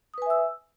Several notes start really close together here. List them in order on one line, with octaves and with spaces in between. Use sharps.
D#6 B4 G#5 E5 E6